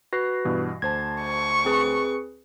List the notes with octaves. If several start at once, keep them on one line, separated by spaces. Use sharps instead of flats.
F#4 B4 A#6 C7
G2 B2 E3
D2 C5 A5 G#6
C#6
C4 G#4 B4